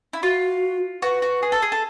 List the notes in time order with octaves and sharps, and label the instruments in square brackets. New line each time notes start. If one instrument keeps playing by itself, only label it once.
[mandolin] E4
[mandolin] F4 [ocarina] F#4
[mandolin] F#4 [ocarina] B4
[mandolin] F#4
G#4
A4
G#4
A4